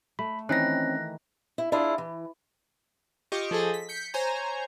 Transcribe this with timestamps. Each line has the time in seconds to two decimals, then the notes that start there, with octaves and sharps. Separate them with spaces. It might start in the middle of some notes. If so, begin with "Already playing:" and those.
0.19 A3 B5
0.49 D#3 E3 C4 C#4 E4 F#6 A#6
1.58 E4
1.72 D4 E4 F4 G#4
1.98 E3
3.32 F4 G4 D#5 C#6 D6
3.51 F3 G#4 A4 D#5
3.74 B6
3.89 G6 B6 C#7
4.14 C5 C#5 G#5 A#5